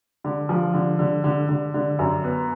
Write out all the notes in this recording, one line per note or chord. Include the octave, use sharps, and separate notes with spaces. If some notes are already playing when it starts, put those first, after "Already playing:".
D3
F3
D3
D3
D3
D3
D3
F#2
B3